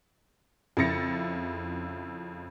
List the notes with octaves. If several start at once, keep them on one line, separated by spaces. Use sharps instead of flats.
F2 C#3 E4 A6 A#6 C#7